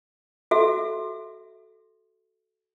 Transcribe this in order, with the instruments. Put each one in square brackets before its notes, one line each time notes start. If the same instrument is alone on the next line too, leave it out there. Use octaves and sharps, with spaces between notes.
[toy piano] F#4 A4 E5